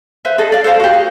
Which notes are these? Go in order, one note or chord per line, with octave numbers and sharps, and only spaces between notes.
B4 C5 E5 F5
G#4 A4 D#5
D5 F5
A4 C5 F5 A5
F#4 G4
G#4